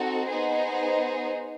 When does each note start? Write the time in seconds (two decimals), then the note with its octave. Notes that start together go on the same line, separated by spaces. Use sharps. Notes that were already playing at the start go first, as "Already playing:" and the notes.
Already playing: C4 D#4 F#4 A4
0.26 B3 D#4 G#4 C5